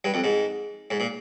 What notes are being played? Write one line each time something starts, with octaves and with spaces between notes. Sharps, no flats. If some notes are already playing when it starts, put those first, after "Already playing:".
G2
F2
G#2
G#2
A#2